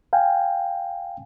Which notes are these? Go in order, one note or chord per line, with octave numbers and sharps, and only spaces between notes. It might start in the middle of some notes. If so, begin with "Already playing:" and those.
F5 G5 G#5